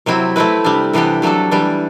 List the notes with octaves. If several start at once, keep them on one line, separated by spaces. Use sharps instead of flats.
C3 F#3 C4 E4
A3 C4 E4 B4
C3 G3 D4
C3 E3 B3 D4 G4
C3 F#3 A3 D4 A4
E3 G3 D4 G4